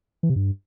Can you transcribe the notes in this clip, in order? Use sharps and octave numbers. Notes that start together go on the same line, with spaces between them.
E3
C3
G2